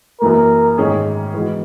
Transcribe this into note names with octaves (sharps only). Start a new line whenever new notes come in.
F#2 E3 A#3 A#4
G#2 D#3 G#3 C#4 G#4
E3 G#3 B3 F#4